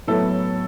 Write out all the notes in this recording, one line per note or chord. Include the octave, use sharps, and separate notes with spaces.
A2 F#3 B3 E4 A4